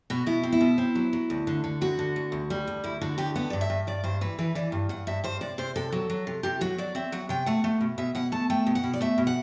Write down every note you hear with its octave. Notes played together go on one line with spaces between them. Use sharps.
B2 F#4
B2 E4
C4
E4
B2
C4
F#3
F#3
D2
D3
D3
D2 F#4
D3
D2
D2
G3
D2
D2 E4
D3 F#4
D2 G4
B3 F#5
G2 D5
E5
G2
G2 D5
G2 C5
E3 B4
E3 B4
E3 D5
G2
G2 F#5
G2 E5
G2 C5
C3 D5
C3 C5
C3 A4
F#3
F#3
C3
C3 G4
F#3 F#4
F#3 D5
C4 E5
F#3 F#5
C3 G5
A3 F#5
A3
B2
B2 E5
B2 F#5
A3 A5
A3 G5
B2
F#5
B2
D5
A3 E5
B2
F#5